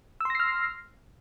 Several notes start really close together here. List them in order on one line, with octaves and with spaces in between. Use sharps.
E6 C6 A#6 C7 F6